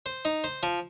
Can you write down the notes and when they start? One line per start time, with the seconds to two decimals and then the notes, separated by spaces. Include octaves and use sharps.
0.06 C5
0.25 D#4
0.44 C5
0.63 F3